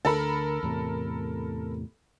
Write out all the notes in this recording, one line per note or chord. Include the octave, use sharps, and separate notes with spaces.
D2 D3 A4 A#4 B5
E2 A2 C3